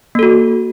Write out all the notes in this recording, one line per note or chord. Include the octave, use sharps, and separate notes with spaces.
A#3 F#4 A4